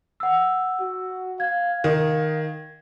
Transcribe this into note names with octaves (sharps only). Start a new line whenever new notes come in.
F#5 E6
F#4
F5 G#6
D#3 F5